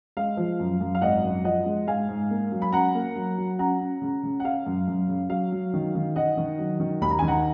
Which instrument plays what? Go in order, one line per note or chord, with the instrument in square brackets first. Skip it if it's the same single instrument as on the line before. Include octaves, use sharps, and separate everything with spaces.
[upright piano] G#3 F5
F3
F#2
F#2
F5
G#1 D#5 F#5
F#2
F3 D#5 F#5
G#3
G#2 F5 G#5
G#2
A#3
F#3
B5
C#4 F#5 A#5
A#3
F#3
F#3
C#4 F#5 A#5
C#4
C#3
C#3
F#5
C#4 F5
F#2
F#2
C#3
F#3 F5
F#3
D#3
D#3
D#3 D#5 F#5
D#3
F#3
D#3
D#2 B5
A#5
D#3 G#5
F#5 A#5